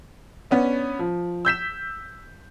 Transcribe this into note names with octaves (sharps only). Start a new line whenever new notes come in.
B3 C#4 D4
F3
E6 G6 B6 E7